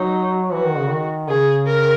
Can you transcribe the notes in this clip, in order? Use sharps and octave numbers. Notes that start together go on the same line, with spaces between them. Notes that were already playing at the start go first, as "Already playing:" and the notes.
Already playing: F#3 D#4
E3 F#4
D#3
C#3
D#3
C#3 G#4
A#4